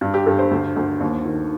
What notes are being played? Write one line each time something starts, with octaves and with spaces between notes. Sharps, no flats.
G2
G4
G2 A4
C5
D2
D2
D#2
D#3